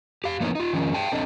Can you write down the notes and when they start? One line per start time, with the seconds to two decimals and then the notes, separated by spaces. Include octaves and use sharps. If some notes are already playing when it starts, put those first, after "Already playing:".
0.24 G4 F5
0.40 F3 A#3 B3 C#4 D#4 E4
0.55 D#4 F4
0.73 D#3 F3 G#3 C#4
0.94 G#4 D5 G5 A5
1.12 C4 D4 A4 B4 D#5 A5